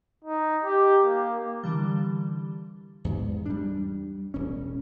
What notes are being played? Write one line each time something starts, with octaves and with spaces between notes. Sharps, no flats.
D#4
G4
A#3
D3 E3 G3
E2 G#2
G3 D4
E1 C#4